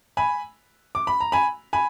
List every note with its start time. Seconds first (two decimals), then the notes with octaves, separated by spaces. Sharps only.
0.17 G#5 B5
0.95 D6
1.07 B5
1.20 A#5
1.32 G#5 B5
1.73 G#5 B5